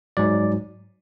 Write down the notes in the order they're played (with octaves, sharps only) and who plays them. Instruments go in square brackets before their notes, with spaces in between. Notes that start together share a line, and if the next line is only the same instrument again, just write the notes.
[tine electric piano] G#2 F#3 D5